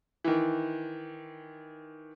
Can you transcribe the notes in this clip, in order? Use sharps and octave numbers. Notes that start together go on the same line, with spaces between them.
D#3 E3